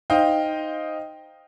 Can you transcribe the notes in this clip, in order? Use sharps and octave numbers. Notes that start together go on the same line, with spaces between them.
D#4 C5 D#5 F5 G5